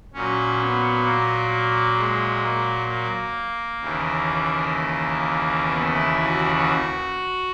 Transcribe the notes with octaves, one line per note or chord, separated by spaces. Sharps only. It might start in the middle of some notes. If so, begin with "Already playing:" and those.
A#2 F#3 C#4
B3
A#3
G#3
A#3
A#3
D#2 C#3 E3
B3
E4
F#4
F#4